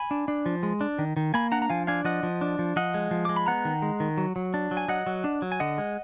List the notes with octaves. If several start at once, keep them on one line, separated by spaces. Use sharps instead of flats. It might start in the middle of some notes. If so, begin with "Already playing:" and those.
Already playing: G#5 B5
D4
D4
F3
G#3
D4
D#3
D#3
A#3 G#5 B5
D4 F#5 A#5
A#5
F3 F5 G#5
D4 F5 G#5
F3 D#5 F#5
F3
D4
F3
F3 D#5 F#5
G#3
F3
G#3 D6
B5
B3 F#5 A#5
D#3
G#3
D#3
F#3
F#3
D4
F#3
G#5
F#3 D#5 F#5
F#3
D4
F#3
G#5
D3 D#5 F#5
G#3